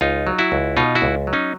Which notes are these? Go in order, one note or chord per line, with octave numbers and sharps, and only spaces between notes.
C#2 D#4 F4
F#3
E4 F#4
C#2
B2 D#4 F4
E4 F#4
C#2
F#3
C#4 D#4